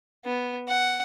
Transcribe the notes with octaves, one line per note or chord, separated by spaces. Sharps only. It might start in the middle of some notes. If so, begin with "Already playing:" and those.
B3
F#5